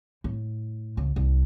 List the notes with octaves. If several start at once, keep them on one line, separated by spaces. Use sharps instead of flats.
A2
C#2
C2